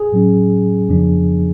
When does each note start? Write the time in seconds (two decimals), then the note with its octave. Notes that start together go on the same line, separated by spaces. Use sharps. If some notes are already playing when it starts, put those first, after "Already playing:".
Already playing: G#4
0.12 A2 F#3 C#4
0.89 F2 C#3 F3 B3 D4